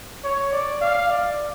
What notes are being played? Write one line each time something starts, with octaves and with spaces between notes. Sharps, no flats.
C#5
D5
F5
D5